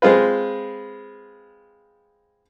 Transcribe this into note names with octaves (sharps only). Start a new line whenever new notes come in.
G#3 C4 F4 B4